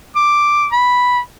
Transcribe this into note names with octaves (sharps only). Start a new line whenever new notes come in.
D6
B5